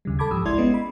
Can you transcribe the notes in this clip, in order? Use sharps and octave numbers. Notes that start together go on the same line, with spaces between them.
D#2 C#3 G3
A4 A5 B5 D6 G#6
C#2 G#2 F3 G4 D#6 E6
G#1 G#3 E4 D5 C6 G#6
G#3 B3 C#4 D#5
B5